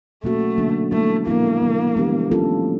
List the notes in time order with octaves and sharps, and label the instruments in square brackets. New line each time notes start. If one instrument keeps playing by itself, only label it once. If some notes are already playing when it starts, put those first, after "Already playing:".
[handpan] B2 F#3 A#3 C#4 F#4 [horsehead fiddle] A3
[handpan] D3 F#3 A#3 D4
[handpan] G3 B3 E4 A4 [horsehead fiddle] A3
[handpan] A#2 F3 G#3 B3 E4 [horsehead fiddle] A#3
[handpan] C#3 E3 G3
E3 G#3 B3 D4 G4
F#3 A#3 C#4 F4 A4